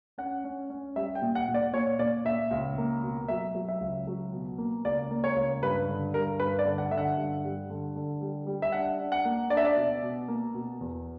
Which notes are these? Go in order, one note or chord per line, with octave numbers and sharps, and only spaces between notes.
C#4 F#5
C#4
C#4
G3 E5
G5
A#2
F#5
A#2
D5
A#2 C#5
A#2 D5
A#2 E5
C#2
A#3
B2
F#3 E5
F#3
E5
C#2
F#3
B2
A#3
C#2 D5
A#3
C#5
C#2
G2 B4
D3
G2 A#4
G2 B4
D5
D3
F#5
D3 E5
F#5
G2
G3
D3
D3
G3
G3
E5
D4 F#5
D4
F#5
A#3
D4 D5
E5
D5
B2
B2
A#3
B2
E2